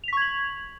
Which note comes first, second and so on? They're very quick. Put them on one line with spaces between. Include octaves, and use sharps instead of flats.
F7 B6 C#6 G#6 F#7